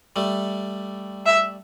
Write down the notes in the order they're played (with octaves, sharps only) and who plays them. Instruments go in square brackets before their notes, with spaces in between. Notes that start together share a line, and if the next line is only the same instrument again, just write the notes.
[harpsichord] G3 A3
[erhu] E5